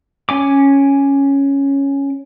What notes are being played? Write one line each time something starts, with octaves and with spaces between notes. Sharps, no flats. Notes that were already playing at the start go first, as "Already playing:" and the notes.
C#4 G#5 D6